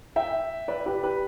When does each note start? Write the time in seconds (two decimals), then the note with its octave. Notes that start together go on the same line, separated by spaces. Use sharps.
0.16 E5 G5
0.68 B4 D5
0.86 G4 B4
1.03 G4 B4